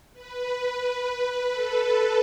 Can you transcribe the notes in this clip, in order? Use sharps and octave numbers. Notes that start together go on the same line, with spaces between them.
B4
A4